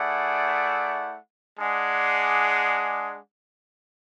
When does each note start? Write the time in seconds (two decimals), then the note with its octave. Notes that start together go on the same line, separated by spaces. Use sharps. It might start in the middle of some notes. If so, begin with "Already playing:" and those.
Already playing: A3 E4 G#4 D5 F#5
1.58 G#3 D4 G#4 D5 F#5